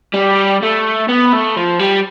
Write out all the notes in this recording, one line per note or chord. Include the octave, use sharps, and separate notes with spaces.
G3
A3
B3
A3
F3
G3